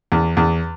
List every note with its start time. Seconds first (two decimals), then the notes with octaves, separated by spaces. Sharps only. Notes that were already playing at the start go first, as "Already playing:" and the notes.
0.12 E2
0.37 E2